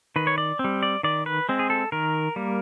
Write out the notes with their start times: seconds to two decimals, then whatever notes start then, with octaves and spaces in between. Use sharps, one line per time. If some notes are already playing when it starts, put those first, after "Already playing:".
0.16 D#3 B4
0.27 C#5
0.38 D5
0.59 C4
0.64 G3
0.83 D5
1.03 D#3 D5
1.26 B4
1.49 G#3 C4
1.59 G#4
1.70 A4
1.92 D#3 A#4
2.36 G3 A#3